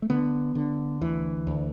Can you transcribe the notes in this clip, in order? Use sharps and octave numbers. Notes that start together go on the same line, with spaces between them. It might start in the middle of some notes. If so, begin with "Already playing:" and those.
A3
D3 B3
D3
D2 E3
D2